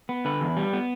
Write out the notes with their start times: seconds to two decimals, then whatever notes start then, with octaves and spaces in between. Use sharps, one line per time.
0.09 B3
0.25 D3 B4
0.41 E2
0.57 G3
0.73 B3